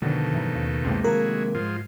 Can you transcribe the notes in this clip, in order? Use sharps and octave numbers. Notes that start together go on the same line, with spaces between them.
F2 B2 D3 D#3 A3 D4
G2 E3 F#3
D#2 C#3
C2 F2 A2 C3 G#3 A#3
D#3 F3 A3 E4 F#4 G#4 A#4
G#2 F3 G#3 F4